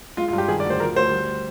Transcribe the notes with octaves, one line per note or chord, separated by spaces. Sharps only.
G#3 F4
F4
G2
G4
D#3 G#4
D5
D2
C5
F3 A#4
D2 C5
G3